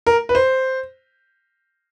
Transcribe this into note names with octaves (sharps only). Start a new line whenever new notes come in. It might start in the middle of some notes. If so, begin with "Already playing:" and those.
A#4
B4
C5